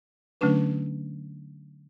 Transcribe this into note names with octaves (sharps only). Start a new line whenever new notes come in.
D3 F#3 A3 C#4 D4 B4